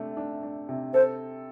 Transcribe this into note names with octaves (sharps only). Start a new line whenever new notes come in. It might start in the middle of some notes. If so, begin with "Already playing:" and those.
Already playing: C3 A3 D4
D4
D4
C3
A4 C5